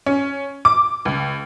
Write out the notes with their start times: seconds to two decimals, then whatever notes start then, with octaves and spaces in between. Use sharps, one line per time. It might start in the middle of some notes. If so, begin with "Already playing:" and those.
0.06 C#4
0.65 D6
1.05 C#2